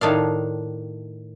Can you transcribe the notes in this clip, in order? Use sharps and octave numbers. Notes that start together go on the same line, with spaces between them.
A2 D#3 D4 F5